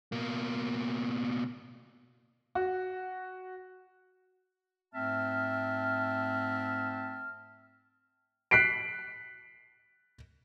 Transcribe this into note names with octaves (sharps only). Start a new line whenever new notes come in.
B2 A#3
F#4
G#2 A3 C4 E5 A5 F6
F#6 B6 C7 D7